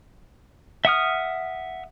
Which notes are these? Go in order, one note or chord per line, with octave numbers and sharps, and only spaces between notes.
E5 F#5 D#6 F6